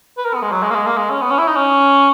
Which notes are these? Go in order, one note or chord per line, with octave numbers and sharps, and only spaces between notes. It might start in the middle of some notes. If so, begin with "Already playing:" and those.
B4
A#4
B3
G#3
F#3
G#3
A#3
G#3
A#3
G#3
C#4
B3
C#4
E4
D#4
C#4